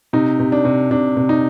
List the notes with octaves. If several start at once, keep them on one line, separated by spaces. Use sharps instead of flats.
C3 D#4
C3
D4
C3
C3 D4
C3
D#4